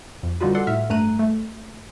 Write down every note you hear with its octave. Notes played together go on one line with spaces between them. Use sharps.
F2
D3 G3 D#4 F4 F#4 B4
A4 D5 F#5 C6
A2 E5 F6
G2 A3 A#5 F#6 D#7
A3